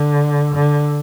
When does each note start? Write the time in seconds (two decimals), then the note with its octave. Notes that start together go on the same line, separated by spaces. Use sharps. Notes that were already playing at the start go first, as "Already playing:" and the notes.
Already playing: D3
0.55 D3